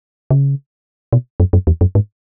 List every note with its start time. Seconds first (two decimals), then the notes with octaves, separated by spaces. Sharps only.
0.31 C#3
1.13 B2
1.40 F#2
1.53 F#2
1.67 E2
1.81 F#2
1.95 G#2